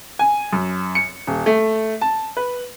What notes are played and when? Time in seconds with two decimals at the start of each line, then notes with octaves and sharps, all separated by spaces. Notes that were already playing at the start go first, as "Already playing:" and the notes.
0.19 G#5
0.53 F#2
0.95 C#7
1.27 D#1
1.46 A3
2.01 A5
2.37 B4